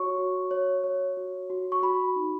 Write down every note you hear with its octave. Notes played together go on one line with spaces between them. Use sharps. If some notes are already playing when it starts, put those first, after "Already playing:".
Already playing: F#4 C#5 C#6
F#4
C#5
C#5
F#4
F#4
C#6
F#4 B5
D#4